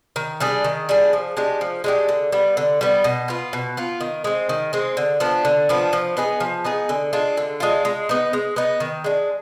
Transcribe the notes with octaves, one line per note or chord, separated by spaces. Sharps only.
D#3
G3 D4 G#4
D#3
G3 D4 G#4
F3
G#3 D4 G4
F3
G#3 D4 G4
D3
G3 B3
D3
G3 B3
B2
B3 F4
B2
B3 F4
D#3
G#3 C4
D#3
G#3 C4
D3
F3 B3 D4
D3
F3 B3 D4
F3
B3 D#4 G#4
F3
B3 D#4 G#4
D3
G#3 D4 F4
D3
G#3 D4 F4
G#3
B3 D#4
G#3
B3 D#4
D#3
G#3 D4